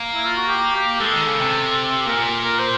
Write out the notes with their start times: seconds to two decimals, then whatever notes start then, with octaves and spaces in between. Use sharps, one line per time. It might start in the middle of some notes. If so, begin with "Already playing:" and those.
Already playing: A#3
0.14 E4
0.25 F4
0.37 F#4
0.47 G4
0.75 G4
1.00 G#3 A4
1.13 D#3
1.27 C#3
1.40 C3
2.06 A#2 A#4
2.42 A#4
2.59 C5